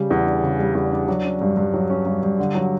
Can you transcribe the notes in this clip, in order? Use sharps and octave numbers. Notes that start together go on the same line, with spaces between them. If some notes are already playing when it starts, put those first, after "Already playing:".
Already playing: C#3 G3
E2
D4
C#3
G3
E2
D4
F#3
C#4
G2
G2
F#3
C#4
G2
G2
D3
F#3